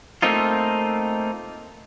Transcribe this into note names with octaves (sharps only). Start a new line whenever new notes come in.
A3 A#3 C4 D#4 F4